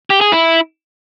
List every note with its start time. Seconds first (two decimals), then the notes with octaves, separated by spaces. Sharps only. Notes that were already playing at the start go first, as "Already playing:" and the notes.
0.10 G4
0.21 G#4
0.32 E4